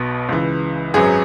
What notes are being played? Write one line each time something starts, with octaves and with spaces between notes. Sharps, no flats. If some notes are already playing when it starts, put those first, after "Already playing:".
Already playing: B1 B2 B3
C#2 C#3 E3
G#1 F#2 F#3 B3 G#4